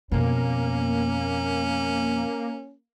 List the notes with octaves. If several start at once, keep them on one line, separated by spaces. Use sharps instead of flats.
F2 B2 A#3 C#4